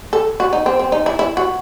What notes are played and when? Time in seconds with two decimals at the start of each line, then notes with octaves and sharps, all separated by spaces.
0.13 A4
0.40 F#4
0.53 D#4
0.66 C4
0.79 C4
0.92 D#4
1.06 E4
1.19 E4
1.37 F#4